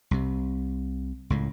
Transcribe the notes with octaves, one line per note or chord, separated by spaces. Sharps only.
C2 C3
C#2 A2